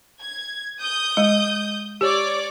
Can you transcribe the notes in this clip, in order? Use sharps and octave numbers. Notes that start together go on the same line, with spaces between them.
G#6
D#6 G6
G#3 D#5
G4 C#5 D5 D6